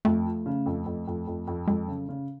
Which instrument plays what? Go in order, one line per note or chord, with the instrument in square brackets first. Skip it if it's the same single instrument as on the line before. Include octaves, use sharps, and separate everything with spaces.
[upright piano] F2 [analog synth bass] A3
[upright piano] F3
C#3
F2
F2
F2
F2
F2
[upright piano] F2 [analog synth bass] G#3
[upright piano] C#3 [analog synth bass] F#3
[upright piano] C#3